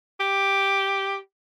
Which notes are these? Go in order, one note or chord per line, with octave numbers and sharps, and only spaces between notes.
G4